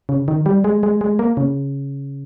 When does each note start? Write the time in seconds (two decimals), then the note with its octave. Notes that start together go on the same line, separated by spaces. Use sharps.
0.09 C#3
0.28 D#3
0.46 G3
0.64 G#3
0.83 G#3
1.01 G#3
1.19 A#3
1.37 C#3